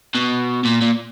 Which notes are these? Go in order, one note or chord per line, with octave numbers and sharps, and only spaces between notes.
B2
A#2
A#2